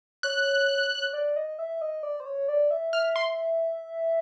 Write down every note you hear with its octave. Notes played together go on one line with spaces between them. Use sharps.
C#5 F#6
D5
D#5
E5
D#5
D5
C5
C#5
D5
E5
E5 F6
C6